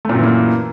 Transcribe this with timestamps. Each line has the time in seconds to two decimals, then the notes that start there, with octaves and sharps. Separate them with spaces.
0.05 A3
0.09 A#2
0.14 F#2
0.19 E3
0.23 A#3